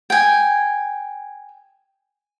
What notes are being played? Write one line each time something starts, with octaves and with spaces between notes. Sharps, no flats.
G5 G#5